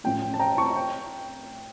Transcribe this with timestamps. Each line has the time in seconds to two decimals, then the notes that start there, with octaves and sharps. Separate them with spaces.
0.04 A2 F3 A3 C#4 G5
0.22 G5
0.34 A5
0.39 G5 A#5
0.58 A5 C#6
0.75 G5 A#5